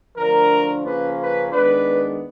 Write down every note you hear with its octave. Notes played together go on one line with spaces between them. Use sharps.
D3 F3 A3 D4 A#4
C#3 F3 A#3 C#4 B4
B4
D#3 G#3 B3 D4 B4